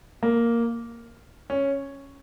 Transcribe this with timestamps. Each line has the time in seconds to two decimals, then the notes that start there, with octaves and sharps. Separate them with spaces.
0.23 A#3
1.50 C#4